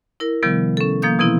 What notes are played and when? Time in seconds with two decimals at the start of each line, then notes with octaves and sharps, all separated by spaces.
0.20 E4 A#4
0.43 C3 D#3 F3 G3 B3
0.77 C#4 A4
1.02 F3 A#3 F5 D#6 G6
1.19 B2 E3 B3 C4 E4